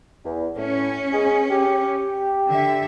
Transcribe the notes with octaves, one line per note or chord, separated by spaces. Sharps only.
E2
A2 C#4
G#3 B3 G#4
G4
D3 E5